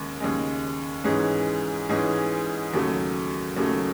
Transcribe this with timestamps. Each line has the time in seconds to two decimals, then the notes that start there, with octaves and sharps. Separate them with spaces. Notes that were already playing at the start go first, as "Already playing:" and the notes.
Already playing: D#2 C#3 G#3
0.20 D#2 C#3 G#3
1.04 G#2 E3 G#3 C#4 G#4
1.89 G#2 E3 G#3 C#4 G#4
2.73 D#2 C#3 F#3 A3
3.56 D#2 C#3 F#3 A3